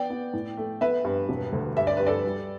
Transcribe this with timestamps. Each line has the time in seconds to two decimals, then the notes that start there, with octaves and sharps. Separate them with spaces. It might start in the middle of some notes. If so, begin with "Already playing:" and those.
Already playing: B3 D5 G5
0.10 B3
0.33 A2
0.57 A3
0.81 B3 B4 E5
1.05 G2
1.29 E1
1.53 D2
1.76 G2 E5
1.87 D5
1.97 G2 B4
2.06 A4 D5
2.24 G3